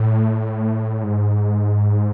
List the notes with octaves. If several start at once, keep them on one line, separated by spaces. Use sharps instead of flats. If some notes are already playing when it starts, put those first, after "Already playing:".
Already playing: A2
G#2